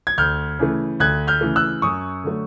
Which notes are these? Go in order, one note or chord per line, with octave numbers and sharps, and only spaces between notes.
G#6
D2 F6 G6
C#3 E3 A3
D2 F#6 G#6
F6 G6
C#3 E3 A3
E6 F#6
F#2 C#6 D#6
D3 F#3 A3